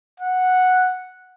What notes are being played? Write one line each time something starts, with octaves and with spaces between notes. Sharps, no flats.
F#5